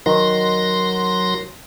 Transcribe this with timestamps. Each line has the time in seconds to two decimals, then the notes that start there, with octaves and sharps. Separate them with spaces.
0.06 D#3 F#3 C6 A#6